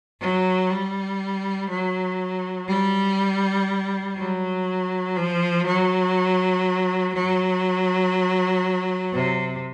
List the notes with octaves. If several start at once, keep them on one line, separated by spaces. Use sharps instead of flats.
F#3
G3
F#3
G3
F#3
F3
F#3
F#3
C3